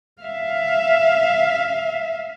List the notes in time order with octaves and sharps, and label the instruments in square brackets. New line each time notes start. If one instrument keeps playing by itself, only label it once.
[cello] E5 F5